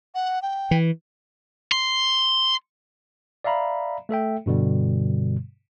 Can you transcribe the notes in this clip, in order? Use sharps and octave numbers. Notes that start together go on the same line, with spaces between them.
F#5
G5
E3
C6
D5 E5 F5 A#5 B5
A3 A4 E5 G5
G2 B2 D3 G3